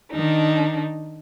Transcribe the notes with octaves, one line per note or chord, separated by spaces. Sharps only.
D#3 D4 D#4